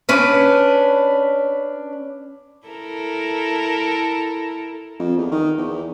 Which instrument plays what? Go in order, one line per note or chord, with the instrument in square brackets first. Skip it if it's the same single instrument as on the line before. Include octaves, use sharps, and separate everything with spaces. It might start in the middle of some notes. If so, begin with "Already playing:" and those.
[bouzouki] C#4 D4 B4
[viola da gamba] E4 A4 A#4
[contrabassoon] F2
E2
D#3
E2